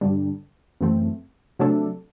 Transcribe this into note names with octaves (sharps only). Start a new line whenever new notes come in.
G2 D3 G3 D4
F#2 E3 A3 C4
C3 F#3 A3 D4 A4